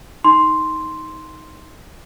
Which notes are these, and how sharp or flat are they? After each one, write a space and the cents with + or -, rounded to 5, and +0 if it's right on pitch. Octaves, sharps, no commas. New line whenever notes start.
D#4 +15 C6 +0